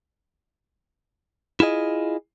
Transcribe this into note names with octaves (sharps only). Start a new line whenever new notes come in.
E4 F4 G#4 D#5